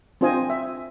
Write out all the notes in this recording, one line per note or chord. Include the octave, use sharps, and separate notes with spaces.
C4 D4 F4 C5 D#5 G#5
E5